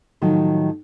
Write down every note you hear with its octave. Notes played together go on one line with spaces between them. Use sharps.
A2 D#3 F3 F#3